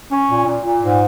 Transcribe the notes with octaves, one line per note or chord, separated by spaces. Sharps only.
C#4
A#2
A#2
A#2
G#2